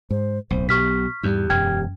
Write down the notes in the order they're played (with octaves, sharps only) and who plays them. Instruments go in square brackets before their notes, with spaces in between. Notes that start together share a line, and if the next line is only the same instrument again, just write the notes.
[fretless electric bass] G#2 [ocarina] C5
[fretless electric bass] D1 [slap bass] B1 [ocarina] C5
[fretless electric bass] B2 [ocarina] G4 [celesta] C#6 F6 B6
[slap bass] E2 [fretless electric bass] G#2 G3 [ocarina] G4
[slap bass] E1 [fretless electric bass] F#2 [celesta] G5 F6 G#6